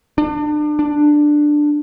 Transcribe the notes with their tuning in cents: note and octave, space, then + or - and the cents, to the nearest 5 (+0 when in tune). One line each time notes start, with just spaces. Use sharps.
D4 +30
D4 +10